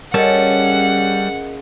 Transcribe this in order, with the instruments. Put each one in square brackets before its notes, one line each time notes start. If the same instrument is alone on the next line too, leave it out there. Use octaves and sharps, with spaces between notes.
[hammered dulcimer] C#3 [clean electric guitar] G3 C#4 A4 [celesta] A#4 D#5 [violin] F#5